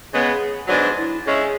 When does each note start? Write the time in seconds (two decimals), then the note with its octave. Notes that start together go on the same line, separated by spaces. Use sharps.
0.12 C#3 G#3 B3 G#4
0.68 G#2 F#3 B3 D4 F#4
0.97 E4
1.25 C#3 G#3 C#4 E4 G#4 A4